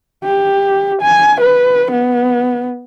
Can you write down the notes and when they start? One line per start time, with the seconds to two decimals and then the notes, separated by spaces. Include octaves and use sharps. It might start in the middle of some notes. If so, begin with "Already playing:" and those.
0.24 G4
1.02 G#5
1.41 B4
1.91 B3